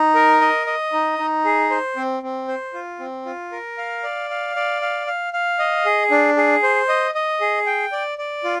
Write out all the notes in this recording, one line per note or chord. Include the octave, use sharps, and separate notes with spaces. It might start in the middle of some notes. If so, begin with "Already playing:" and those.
Already playing: D#4
A#4
D#5
D#5
D#4
D#4
G#4
C5
C4
C4
C5
F4
C4
F4
A#4
F5
D5
F5
D5
F5
F5
F5
D#5
G#4
D4
G#4
C5
D#5
D#5
G#4
G5
D5
D5
F4